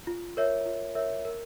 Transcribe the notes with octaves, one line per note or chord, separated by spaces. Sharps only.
F4
A#4 C#5 E5
F4
A#4 C#5 E5
A#4